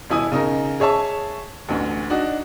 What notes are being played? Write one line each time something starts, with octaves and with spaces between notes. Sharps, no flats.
D#1 B2 E4 G#5 D#6
C#3 D#4 A#4
G#4 C#5 E5 A5 C#6
A1 D2
D4 D#4 F#4